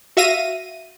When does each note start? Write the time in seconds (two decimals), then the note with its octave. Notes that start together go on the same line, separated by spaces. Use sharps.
0.17 F#4 E5 F5 A#6 D#7